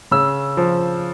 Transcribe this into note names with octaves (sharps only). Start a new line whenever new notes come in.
C#3 E6
F3